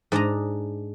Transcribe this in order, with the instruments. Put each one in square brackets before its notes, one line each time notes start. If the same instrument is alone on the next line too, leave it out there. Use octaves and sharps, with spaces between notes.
[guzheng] G#2 D4 D#5 A#5